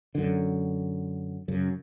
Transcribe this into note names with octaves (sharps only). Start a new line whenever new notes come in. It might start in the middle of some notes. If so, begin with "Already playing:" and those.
F#2 D3
F#2 C#3